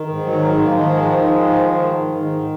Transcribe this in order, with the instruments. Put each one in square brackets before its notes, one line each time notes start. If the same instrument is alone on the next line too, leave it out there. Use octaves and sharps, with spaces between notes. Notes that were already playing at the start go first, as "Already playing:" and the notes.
Already playing: [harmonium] D#3
G#2
F#3
D#3
G#2 G#3
A#3
F3 G#3
D#3
G#2
D#3
G#2
D#3
G#2
D#3